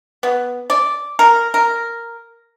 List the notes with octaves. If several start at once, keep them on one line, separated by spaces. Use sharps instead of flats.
B3
D5
A#4
A#4